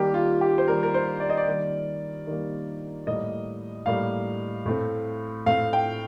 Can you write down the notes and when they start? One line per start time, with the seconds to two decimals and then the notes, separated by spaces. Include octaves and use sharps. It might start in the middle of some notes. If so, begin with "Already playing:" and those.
Already playing: D#3 G3 A#3 G4
0.14 F4
0.41 G4
0.58 C5
0.67 D#3 G3 A#3 A#4
0.83 A#4
0.94 C5
1.20 D5
1.30 D#5
1.37 D5
1.47 D#3 G3 A#3
2.27 D#3 G3 A#3
3.06 A2 G3 A#3 D#5
3.86 A2 G3 A#3 F5
4.66 A2 A3 C4
5.46 A2 A3 C4 F5
5.73 G5